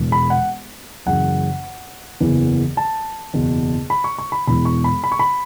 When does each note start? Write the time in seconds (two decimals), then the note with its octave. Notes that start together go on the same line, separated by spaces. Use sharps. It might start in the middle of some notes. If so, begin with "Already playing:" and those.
Already playing: E1 E2 E3
0.12 B5
0.30 F#5
1.06 F#1 F#2 C#3 E3 F#5
2.21 F#1 E2 E3
2.77 A5
3.34 F#1 E2 B2
3.90 B5
4.04 C#6
4.18 C#6
4.32 B5
4.47 E1 E2 E3 B5
4.65 C#6
4.84 B5
5.04 B5
5.12 C#6
5.19 B5